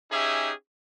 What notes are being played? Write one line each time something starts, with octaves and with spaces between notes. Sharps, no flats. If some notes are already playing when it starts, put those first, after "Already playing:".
C#4 D#4 G4 G#4 E5